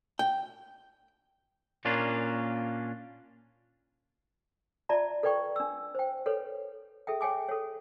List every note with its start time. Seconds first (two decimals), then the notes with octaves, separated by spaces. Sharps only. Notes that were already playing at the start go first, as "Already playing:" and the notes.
0.19 G5
1.85 A#2 A#3 C#4 D4 F4
4.89 F4 D5 E5 A5 A#5
5.23 A4 B4 D5 G5 C#6
5.56 D4 E6
5.95 C5 G5
6.26 A4 B4 C#5
7.07 G#4 A4 E5 G5
7.21 C#5 G5 G#5 D6
7.49 A4 C#5